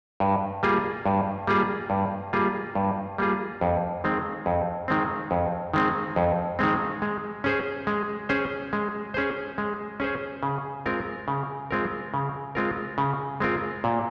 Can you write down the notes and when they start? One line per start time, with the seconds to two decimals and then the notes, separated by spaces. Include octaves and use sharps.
0.20 G2
0.63 G3 A#3 F4 G#4
1.06 G2
1.47 G3 A#3 F4 G#4
1.90 G2
2.33 G3 A#3 F4 G#4
2.75 G2
3.18 G3 A#3 F4 G#4
3.61 F2
4.04 D#3 G#3 C4
4.46 F2
4.88 D#3 G#3 C4
5.31 F2
5.74 D#3 G#3 C4
6.16 F2
6.59 D#3 G#3 C4
7.02 G#3
7.44 C#4 G#4 C5
7.87 G#3
8.29 C#4 G#4 C5
8.73 G#3
9.14 C#4 G#4 C5
9.58 G#3
10.00 C#4 G#4 C5
10.43 C#3
10.86 G#3 C4 F4 A#4
11.28 C#3
11.71 G#3 C4 F4 A#4
12.14 C#3
12.55 G#3 C4 F4 A#4
12.98 C#3
13.40 G#3 C4 F4 A#4
13.84 A#2